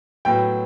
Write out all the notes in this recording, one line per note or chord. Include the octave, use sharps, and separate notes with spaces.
A2 F#3 B3 G5